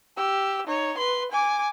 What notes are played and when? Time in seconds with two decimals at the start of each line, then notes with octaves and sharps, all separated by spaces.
0.16 G4 E6
0.67 D#4 C#5
0.97 B4 C6
1.32 G#5 D6